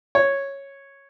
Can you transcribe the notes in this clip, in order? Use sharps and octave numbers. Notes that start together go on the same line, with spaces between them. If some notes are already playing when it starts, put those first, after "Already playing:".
C#5